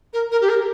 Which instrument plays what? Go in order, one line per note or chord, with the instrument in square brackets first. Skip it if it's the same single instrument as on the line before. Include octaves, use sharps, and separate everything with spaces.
[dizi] A#4
A#4
G4
A#4